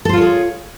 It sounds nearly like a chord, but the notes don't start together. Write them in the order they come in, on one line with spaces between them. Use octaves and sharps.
A4 C5 F4 C#5 G#4